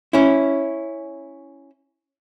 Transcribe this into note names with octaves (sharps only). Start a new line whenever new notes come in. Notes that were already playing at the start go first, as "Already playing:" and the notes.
C#4 E4